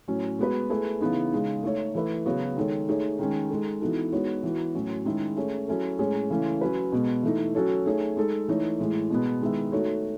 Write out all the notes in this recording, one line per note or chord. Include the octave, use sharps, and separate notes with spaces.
A2 F#3 C#4
G#3 B3 F#4 B4
A3 E4 G#4 B4
C#3 E3 B3 D#4
C#3 G#3 D#4
A3 D#4 A4 C#5
E3 A3 E4 B4
C#3 F#3 B3 F#4 C#5
D#3 G#3 D#4 A4 C#5
A3 D#4 G#4 C#5
D#3 G#3 C#4
G#3 D#4 A4
E3 B3 D#4 F#4 A4
G#3 B3 D#4 F#4 C#5
E3 B3 F#4
A2 F#3 C#4 F#4
D#3 G#3 C#4 E4 G#4
A3 C#4 G#4 C#5
F#3 C#4 E4 A4
A2 G#3 C#4 G#4 C#5
C#3 E3 A3 C#4
F#3 C#4 F#4 B4
B2 G#3 B3
E3 A3 D#4
F#3 C#4 F#4 A4 C#5
A3 D#4 G#4 C#5
G#3 D#4 A4
E3 A3 D#4 A4 C#5
A2 E3 G#3
B2 G#3 B3
D#3 G#3 B3 E4
A3 D#4 F#4 A4 C#5